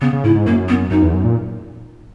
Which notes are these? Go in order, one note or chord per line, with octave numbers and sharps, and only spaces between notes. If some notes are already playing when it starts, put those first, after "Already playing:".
C#3 B3
C#3
G#2 E4
G#2
F#2 A#3
B3
F#2 D#4
E2
F#2
A#2